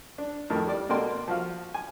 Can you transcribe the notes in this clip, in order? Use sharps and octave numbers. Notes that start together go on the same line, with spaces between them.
D4
F2 A2 D#3
G3 D5
B2 A3 A#3 D5 G5 C6
F3 F#4 F5
G#5